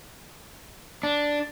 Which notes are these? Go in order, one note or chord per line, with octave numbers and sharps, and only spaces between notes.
D4